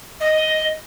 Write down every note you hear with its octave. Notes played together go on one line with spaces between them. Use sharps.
D#5